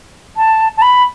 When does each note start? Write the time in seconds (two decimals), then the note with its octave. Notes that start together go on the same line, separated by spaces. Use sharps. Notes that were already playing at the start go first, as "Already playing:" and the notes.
0.37 A5
0.77 A5
0.82 B5